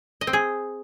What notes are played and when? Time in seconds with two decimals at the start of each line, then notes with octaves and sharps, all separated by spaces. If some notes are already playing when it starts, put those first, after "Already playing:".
0.21 D#5
0.27 C4
0.33 G#4